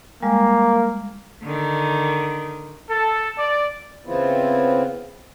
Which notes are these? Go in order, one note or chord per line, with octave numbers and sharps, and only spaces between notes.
G3 G#3 A#3
D3 D#3
A4
D5
C#3 E3 B3 C4 E4 F4